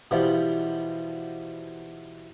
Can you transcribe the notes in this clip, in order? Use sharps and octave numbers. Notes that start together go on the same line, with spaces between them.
B2 E3 F3 G3